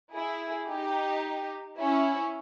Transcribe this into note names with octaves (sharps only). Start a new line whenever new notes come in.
E4 G#4
D#4 G4
C#4 E4